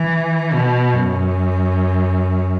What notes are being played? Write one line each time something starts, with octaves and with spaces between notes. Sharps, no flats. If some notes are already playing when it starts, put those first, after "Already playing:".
Already playing: E3
B2
F#2